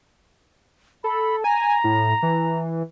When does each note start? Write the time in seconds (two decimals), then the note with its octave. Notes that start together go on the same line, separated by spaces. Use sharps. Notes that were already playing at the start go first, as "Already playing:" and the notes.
1.04 A4 B5
1.44 G#5 A#5
1.84 A2
2.23 E3